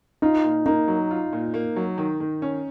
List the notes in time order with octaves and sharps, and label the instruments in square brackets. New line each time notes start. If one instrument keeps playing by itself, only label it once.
[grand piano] D#4 [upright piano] F4
[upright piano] A#2
[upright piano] A#3 [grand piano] D#4
[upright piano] F#3
F4
A#2
A#3
F#3
D#3
D#3
C#4